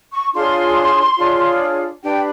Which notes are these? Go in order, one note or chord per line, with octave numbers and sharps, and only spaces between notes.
C#6
D4 F4 G#4 C#5 C6
D4 F4 G#4 C#5
D4 G4 B4 G5